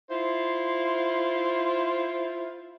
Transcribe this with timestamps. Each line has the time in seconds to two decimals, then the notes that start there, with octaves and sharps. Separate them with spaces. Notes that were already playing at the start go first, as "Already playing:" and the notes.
0.10 E4 F4 C5